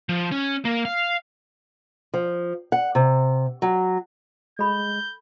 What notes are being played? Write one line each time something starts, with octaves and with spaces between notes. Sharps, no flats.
F3
C#4
A#3
F5
F3
F#5
C3
F#3
G#3 A4 B5 G6